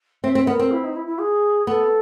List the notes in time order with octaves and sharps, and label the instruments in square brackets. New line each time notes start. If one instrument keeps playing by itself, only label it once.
[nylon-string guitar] C4 [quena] E5
[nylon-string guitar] C4
[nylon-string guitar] B3 [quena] A#4
[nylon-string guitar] C4
[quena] E4
D#4
E4
E4
G#4
[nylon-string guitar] B3 [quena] A4